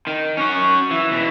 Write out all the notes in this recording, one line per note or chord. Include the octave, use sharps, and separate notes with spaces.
D#3
C#4 F#4
E3
B2 E3